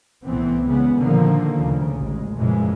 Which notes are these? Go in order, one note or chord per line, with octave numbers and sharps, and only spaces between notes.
C2 A2 E3 B3 C4
E2 C#3 G#3 B3
A#2 D3 D#3 F3 A#3
D2 C#3
A1 G#3
F#2 A#2 C#3 E3 F3 G#3